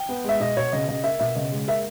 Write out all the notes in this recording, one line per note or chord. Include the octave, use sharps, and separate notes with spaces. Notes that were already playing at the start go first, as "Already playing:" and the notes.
Already playing: G5
B3
G#3 E5
B2 D#5
B2 C#5
C#3 D#5
C#3 D#5
A#3 E5
B2 E5
C#3 D#5
G#3
A#3 E5